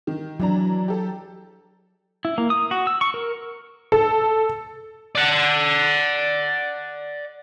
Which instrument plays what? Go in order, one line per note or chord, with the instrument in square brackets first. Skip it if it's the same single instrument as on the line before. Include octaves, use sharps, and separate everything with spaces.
[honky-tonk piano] D#3
[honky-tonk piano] E3 D4 A#5 [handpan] F#3
[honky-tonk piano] G4 A4
[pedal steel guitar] E4
A#3
D#6
F#4
E6
C#6
A#4
[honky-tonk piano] A4
[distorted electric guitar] D5 F#5